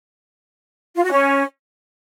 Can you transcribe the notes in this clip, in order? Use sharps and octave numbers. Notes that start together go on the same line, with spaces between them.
F4
F#4
C#4